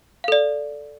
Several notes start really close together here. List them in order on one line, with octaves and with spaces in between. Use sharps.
F5 A4 D5